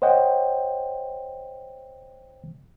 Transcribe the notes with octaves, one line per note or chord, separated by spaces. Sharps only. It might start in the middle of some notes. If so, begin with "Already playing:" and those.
C5 C#5 D#5 F#5 G5